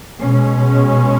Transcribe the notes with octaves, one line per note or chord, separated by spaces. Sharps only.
B2 G#3 C#4